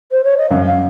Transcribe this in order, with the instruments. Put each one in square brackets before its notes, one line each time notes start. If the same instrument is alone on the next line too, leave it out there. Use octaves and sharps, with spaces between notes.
[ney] C5
C#5
D#5
[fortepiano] F#2 [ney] F5
[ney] F5